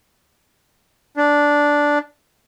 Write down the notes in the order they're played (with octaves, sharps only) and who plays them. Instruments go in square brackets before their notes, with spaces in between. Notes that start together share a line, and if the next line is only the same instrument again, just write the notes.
[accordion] D4